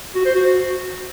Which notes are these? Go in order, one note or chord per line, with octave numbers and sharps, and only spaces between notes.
F#4
C5
F#4